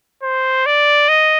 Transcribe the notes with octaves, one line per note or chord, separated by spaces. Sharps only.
C5
D5
D#5